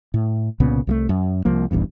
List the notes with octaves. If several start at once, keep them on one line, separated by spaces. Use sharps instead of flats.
A2
C2 A#2 C#3 B3
C2 F3 A3
F#2
C2 F3 A#3
D#1 A1 E2 G2